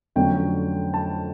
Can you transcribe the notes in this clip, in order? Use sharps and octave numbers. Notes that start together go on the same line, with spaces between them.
F2 D3 F#3 A3 C#4 G5
A5